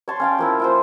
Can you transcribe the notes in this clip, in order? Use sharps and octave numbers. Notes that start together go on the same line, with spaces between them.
C#5 A5 C6
C#4 F5 G5
F3 A#3 E4
E4 F4 C5